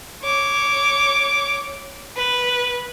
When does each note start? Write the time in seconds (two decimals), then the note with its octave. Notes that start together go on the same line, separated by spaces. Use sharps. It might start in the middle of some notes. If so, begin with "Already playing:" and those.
0.23 C#5 D6
2.17 B4